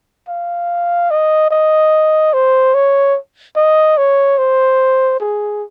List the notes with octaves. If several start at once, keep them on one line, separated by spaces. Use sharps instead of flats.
F5
D#5
D#5
C5
C#5
D#5
C#5
C5
G#4